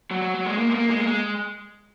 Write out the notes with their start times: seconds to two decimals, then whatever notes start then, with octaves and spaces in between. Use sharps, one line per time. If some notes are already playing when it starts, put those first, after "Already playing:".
0.11 F#3
0.22 F#3
0.35 F#3
0.46 G#3
0.58 A#3
0.71 G#3
0.75 A#3
0.90 G#3
1.01 A#3
1.07 G#3